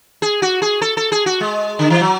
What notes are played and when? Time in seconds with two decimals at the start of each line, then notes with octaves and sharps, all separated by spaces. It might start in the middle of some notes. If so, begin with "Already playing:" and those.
0.22 G#4
0.42 F#4
0.62 G#4
0.81 A4
0.97 A4
1.12 G#4
1.26 F#4
1.41 G#3
1.79 D3
1.90 E3
2.01 F#3